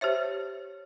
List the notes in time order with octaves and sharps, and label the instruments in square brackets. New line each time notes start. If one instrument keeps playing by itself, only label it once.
[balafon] G4 C5 C#5 E5